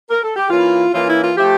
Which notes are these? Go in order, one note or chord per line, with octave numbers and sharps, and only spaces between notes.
A#4
A4
G4
E3 A#3 C#4 E4 F4
E3 A#3 C#4 E4 F4
E4
F4
F3 A3 E4 G4